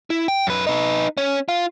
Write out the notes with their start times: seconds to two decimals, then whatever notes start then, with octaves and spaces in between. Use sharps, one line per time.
0.10 E4
0.28 G5
0.47 F#2 B4
0.67 D#4 B4
1.17 C#4
1.48 F4